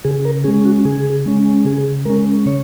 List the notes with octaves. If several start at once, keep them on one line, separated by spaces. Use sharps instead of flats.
C#3 G#4
A#4
G#3 C#4 G#4
F#4
C#3 G#4
G#3 C#4
C#3 G#4
G#3 C#4 A#4
C#3 C#5